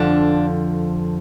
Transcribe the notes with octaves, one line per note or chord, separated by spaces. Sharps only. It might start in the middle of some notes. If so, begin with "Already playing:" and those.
Already playing: F2 D3 F3 D4